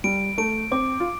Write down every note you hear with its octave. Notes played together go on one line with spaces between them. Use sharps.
G3 D7
A3 D7
C4 D6
F4